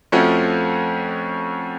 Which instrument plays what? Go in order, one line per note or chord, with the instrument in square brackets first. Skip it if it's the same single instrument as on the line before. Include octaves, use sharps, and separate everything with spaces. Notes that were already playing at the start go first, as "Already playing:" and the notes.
[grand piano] F2 F3 A3 C#4 F#4